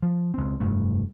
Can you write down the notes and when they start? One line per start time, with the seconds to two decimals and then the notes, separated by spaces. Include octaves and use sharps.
0.02 F3
0.34 C#2 C4
0.60 F1 G2 A3